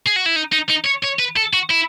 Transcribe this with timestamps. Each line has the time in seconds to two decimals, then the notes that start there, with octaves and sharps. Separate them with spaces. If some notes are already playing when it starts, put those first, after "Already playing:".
0.06 G#4
0.16 F#4
0.26 E4
0.36 D#4
0.53 D#4
0.70 D#4
0.86 C#5
1.04 C#5
1.19 B4
1.37 A4
1.53 F#4
1.70 E4